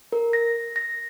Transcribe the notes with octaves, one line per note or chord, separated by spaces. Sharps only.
A#4
A#6
A#6